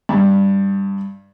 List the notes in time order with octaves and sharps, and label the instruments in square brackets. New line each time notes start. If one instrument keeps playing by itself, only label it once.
[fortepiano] G2